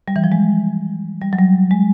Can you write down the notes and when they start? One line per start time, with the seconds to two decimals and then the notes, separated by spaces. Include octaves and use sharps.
0.08 G3
0.16 E3
0.24 F3
0.32 G#3
1.21 G3
1.33 F#3
1.39 G3
1.71 G#3